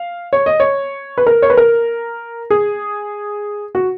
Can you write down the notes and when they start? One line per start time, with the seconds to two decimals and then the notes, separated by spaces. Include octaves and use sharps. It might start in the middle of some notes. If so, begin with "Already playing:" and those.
Already playing: F5
0.33 C#5
0.46 D#5
0.60 C#5
1.18 B4
1.27 A#4
1.42 C#5
1.50 B4
1.57 A#4
2.50 G#4
3.75 F#4